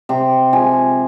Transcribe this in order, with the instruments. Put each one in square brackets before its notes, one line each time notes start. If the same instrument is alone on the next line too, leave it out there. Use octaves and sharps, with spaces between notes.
[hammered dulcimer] C3 G5
F3 G#3 G#5